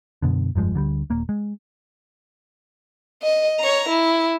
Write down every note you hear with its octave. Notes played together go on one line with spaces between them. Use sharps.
F#2 B2 D3
F1 G2 F3 G#3
D2 D3 F#3 G3
D#1 A#3
G#3
D#5
C#5 A#5
E4